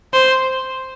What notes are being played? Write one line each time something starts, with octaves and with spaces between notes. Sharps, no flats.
C5